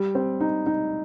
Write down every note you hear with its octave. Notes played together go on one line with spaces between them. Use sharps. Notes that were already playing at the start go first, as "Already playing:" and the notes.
Already playing: G3
C4
D#4
D#4